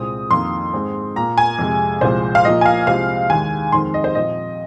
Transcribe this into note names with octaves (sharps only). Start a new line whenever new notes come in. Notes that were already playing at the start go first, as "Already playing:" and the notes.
Already playing: C2 A#2 G#3 C4 D#6
F2 D#3 A#3 C6
G#2 G#3 C4
A#2 A#3 A#5
G#5
F2 C3 G#3
C2 A#2 F3 G#3 C5
F5
A#2 F3 A#3 D#5
G#5
F5
C2 C3 F3 G#3 C4 F5
D#2 D#3 G#3 G#5
F2 D#3 G#3 C4 C6
D#5
C5
A#2 F3 C4 D#5